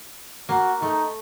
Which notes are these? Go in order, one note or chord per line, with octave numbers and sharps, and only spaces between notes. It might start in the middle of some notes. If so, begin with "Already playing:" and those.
A#3 F#4
A3 D#4